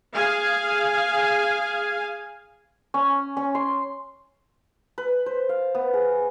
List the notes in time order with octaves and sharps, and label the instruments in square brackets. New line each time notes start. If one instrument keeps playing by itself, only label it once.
[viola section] G#4 F5 G#5
[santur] C#4
C#4
C6
B4
C5
F5
B3
G#4